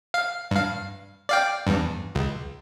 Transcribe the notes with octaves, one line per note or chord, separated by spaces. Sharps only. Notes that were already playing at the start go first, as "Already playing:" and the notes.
F5
G2 F5
D5 F5 G5
E2 G2
C#2